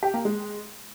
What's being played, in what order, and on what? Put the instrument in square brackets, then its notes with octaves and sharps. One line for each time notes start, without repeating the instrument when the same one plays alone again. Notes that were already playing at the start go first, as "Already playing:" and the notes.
[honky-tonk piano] G4
A#3
G#3